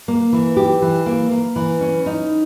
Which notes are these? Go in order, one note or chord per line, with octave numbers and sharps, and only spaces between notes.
A#3
E3
G4
E3
A#3
A#3
E3
C#4
D#4